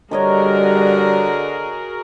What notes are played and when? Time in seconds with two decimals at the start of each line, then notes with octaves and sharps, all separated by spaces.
0.11 D3 G3 F#4 G#4 A#4 C#5 D#5 A#5